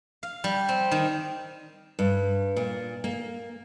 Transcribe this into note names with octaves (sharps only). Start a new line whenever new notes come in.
F5
G3
C4
D#3
G2
A#2
A#3